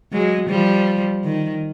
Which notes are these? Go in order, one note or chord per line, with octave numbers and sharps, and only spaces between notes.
F#3 G#3
F3 G3
D#3